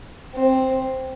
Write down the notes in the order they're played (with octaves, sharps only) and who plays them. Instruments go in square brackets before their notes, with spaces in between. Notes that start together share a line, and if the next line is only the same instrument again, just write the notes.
[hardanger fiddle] C4